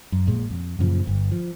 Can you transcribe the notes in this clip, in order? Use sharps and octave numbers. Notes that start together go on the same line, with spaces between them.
F#2
A#1 A#2 G#3
F2
F#2 A#2 C#3 F3
G1
F3